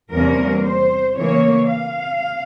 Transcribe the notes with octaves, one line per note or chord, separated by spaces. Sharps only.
E2 C3 G3 A#3 C#4 A#4
C5
C#3 E3 A#3 C#5
F5